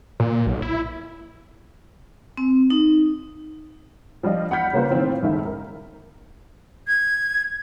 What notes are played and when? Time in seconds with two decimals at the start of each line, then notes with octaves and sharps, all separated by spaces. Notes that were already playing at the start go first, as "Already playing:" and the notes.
0.20 A#2
0.47 B1
0.62 E4
2.37 C4
2.70 D#4
4.23 F3 G3 D4 F4 D#5
4.50 E2 F#5 B5 F6 G6 B6
4.73 C#3 G3 A#3 F4 B4 C5
4.90 A2 D#3 E3 C4 F4
5.22 G1 C#2 D#3 E5
5.45 A#4
6.87 G#6